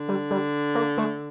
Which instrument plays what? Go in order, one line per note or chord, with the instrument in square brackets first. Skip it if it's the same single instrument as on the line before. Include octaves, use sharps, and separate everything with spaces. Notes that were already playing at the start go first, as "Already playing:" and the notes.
Already playing: [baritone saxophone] D3
[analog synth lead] G3
G3
A#3
A3